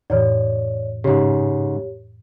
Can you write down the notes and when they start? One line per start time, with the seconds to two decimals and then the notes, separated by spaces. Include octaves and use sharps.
0.10 F2 A2 E3 C#5 D5
1.04 G#2 C#3 G4 C#5